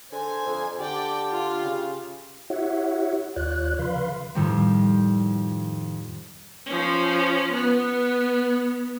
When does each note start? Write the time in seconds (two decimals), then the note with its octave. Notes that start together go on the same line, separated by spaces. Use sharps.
0.12 D3 C5 G#5
0.46 F2
0.79 D3 G4 D5 G5
1.30 F4
1.63 C#3
2.50 E4 F#4 G4 C#5 E5 F#5
3.36 D#2 F4 C#5 D5 F#6
3.79 C#3 F3 B4 F5 B5 C6
4.35 F2 A2 D#3 G3 A3 C4
6.66 F3 C#4
7.52 B3